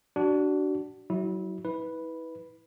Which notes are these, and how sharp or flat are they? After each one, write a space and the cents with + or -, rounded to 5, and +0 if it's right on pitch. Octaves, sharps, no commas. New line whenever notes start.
D4 +0 F#4 +25
F#3 +25 E4 -25
E4 -35 B4 +0